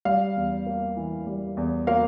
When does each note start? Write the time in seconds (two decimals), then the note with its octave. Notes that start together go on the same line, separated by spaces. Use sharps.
0.05 G3 F5
0.36 E2
0.66 A#3
0.97 E3
1.27 G3
1.57 E2
1.87 A#3 F5